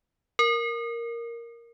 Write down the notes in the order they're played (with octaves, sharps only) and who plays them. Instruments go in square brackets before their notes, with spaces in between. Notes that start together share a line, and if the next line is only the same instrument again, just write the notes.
[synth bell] A#4